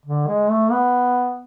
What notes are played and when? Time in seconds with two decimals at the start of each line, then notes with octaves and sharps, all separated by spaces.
0.06 D3
0.28 G#3
0.50 A3
0.71 B3